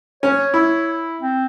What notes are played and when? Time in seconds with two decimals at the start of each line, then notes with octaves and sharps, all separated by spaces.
0.23 C#4 C#5
0.54 E4
1.21 C4